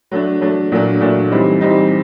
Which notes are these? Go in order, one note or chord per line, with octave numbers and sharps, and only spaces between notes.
F#3 A3 D4
F#3 A3 D4
A#2 F#3 A3 D4
A#2 F#3 A3 D4
E3 G3 C4 D#4
E3 G3 C4 D#4